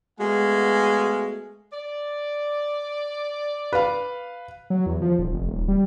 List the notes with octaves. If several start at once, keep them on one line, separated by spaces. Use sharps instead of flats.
G#3 A3 B3 F#4 F5 G#5
D5
B4 F5
F#3
E2
F3
D#1
F1
D#1
G3